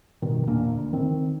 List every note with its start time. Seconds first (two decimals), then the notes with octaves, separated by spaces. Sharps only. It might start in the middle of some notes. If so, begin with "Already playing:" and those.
0.22 G2 B2 D#3
0.47 E1 A#2 A#3 D4
0.72 D2
0.93 D#3 C4